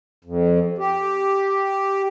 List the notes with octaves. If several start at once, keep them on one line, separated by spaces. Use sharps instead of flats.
F2
G4